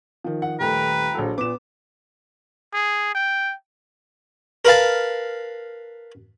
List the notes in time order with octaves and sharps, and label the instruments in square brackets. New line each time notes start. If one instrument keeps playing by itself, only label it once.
[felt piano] D#3 F3
[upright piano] F#5
[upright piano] D#1 A3 [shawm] B4 [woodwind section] G5 A#5
[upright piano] A#1 F#3 A4
[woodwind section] A#2 [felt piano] B3 [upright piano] D6 E7
[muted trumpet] G#4
G5
[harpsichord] A#4 B4 F5 A5